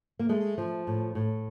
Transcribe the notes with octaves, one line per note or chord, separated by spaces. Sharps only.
A#3
G#3 A3
F3
A2
A2